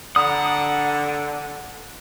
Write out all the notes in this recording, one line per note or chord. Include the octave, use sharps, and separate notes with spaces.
D3 F#5 A#5 B5 D#6